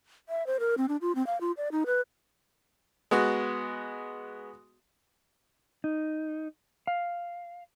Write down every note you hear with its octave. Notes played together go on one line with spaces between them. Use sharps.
E5
C5
A#4
C4
D4
F4
C4
F5
F4
D5
D#4
B4
G#3 B3 F#4
D#4
F5